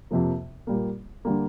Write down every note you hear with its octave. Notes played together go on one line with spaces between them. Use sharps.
F2 C3 F3 A#3
A#2 G3 A#3
D3 G3 A#3